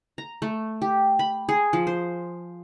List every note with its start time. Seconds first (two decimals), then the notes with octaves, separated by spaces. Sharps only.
0.18 A#5
0.42 A3
0.82 G4
1.19 B5
1.49 G#4
1.73 F3
1.87 C5